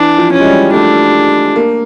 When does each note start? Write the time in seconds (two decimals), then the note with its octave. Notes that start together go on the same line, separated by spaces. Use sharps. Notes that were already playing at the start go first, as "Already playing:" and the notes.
Already playing: E3 D4
0.18 F3
0.32 C#4
0.40 G#3
0.46 G3
0.73 A3 D4
1.56 A#3